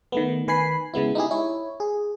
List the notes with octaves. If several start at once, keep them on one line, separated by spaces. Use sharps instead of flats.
D#3 A3 B3
D#3 B4 G#5 B5 C7
C#3 G#3 B3 E4
D#4 E4 G4 G#4
E4 C#5
G#4